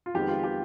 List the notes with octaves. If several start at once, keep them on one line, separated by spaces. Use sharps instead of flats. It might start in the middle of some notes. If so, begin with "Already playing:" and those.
F4
F2 D#3 G#3 B3 G4
F4
G4